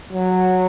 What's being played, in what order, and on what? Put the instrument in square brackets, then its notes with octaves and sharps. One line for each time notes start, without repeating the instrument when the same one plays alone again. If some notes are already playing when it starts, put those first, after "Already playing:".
[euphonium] F#3